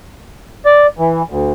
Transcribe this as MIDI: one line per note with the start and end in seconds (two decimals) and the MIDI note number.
0.66 0.87 74
0.99 1.22 52
1.30 1.53 38